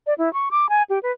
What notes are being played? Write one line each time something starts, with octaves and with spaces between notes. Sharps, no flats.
D5
E4
C#6
D6
G#5
G4
B4